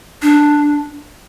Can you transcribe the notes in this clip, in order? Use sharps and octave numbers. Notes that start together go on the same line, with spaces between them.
D4